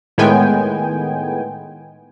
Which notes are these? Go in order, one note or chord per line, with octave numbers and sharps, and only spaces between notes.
A2 D#3 G#3 B3 G5 G#5